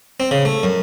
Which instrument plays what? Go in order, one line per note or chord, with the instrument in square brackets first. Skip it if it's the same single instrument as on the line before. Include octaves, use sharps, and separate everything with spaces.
[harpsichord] C4
C#3
A3
F#2